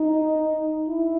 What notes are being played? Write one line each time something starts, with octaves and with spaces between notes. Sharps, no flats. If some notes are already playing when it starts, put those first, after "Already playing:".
Already playing: D#4
E4